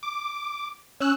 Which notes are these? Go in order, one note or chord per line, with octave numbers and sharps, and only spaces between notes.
D6
C#4 E6 F#6